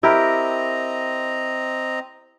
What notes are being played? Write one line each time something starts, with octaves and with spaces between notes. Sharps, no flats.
C4 E4 G4 A#4 D#5 A#5